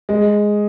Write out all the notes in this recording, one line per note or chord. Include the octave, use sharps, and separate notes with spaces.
G#3